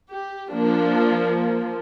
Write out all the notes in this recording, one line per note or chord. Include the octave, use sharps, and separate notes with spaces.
G4
F3 A#3 D4